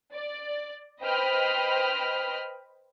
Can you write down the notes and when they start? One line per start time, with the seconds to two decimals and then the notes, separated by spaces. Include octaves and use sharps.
0.13 D5
1.01 B4 C5 D#5 G5 B5 F6